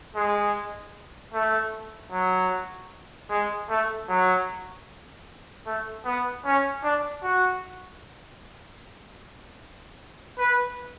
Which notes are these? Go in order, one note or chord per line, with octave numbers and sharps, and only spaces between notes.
G#3
A3
F#3
G#3
A3
F#3
A3
B3
C#4
D4
F#4
B4